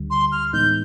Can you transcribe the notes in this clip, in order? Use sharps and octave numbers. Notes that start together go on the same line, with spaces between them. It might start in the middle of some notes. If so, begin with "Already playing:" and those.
Already playing: D2 D3 G3
C6
F6
A2 E3 G#3 B3 D#4 G6